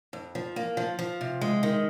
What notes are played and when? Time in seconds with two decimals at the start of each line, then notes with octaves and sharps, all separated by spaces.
0.13 F2
0.35 F3
0.56 A#3
0.77 F3
0.99 F3
1.21 C3
1.41 G#3
1.63 D#3